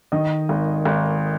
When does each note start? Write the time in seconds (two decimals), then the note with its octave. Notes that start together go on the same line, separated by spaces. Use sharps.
0.12 D#3 D#5
0.49 G#1
0.85 G#1